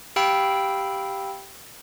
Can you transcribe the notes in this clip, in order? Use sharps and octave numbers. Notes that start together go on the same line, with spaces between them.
G4 F5 G5 B5 E6 D7